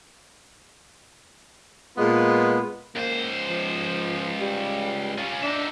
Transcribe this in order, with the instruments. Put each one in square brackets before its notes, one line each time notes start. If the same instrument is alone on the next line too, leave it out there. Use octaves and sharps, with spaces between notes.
[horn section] A#2 G#3 B3 F4 B4
[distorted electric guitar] C#2 C5 [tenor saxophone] A#3
[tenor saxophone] F3
G3
[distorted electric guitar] C#4 F4
[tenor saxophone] D4 [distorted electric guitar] D#4 E5